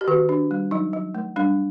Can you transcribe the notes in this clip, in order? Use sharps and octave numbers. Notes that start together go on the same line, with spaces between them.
G4
D#3 F#4
D4
G3
F#3 D#4
F#3
A3
G3 D4